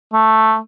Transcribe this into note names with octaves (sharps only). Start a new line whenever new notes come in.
A3